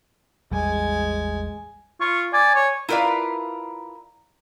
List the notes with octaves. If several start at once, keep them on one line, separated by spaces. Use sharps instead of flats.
A1 E2 G3 G#3 G#5
F4 C#6
D5 G#5
C#5
E4 F4 A#4 B4 D5 F5